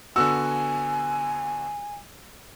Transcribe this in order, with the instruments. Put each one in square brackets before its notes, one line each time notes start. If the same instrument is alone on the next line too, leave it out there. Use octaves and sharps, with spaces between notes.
[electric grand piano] D3 B3 F#4 [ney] G#5 [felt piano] E6